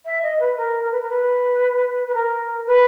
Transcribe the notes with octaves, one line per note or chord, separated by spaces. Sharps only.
E5
D#5
B4
A#4
A#4
B4
A#4
B4
B4
A#4
B4